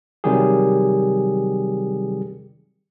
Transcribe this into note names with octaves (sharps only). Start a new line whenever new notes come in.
C3 D#3 F#3 G3 G4 G#4